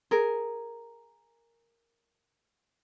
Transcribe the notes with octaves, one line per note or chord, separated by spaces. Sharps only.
G#4 A#4